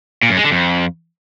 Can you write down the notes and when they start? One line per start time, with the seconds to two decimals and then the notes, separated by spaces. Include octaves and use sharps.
0.23 A#2
0.30 F#2
0.37 G#3
0.44 D3
0.51 F2